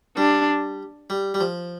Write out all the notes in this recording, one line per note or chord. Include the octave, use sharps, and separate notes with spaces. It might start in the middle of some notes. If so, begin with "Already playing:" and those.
G3 D4
G3
G3
F3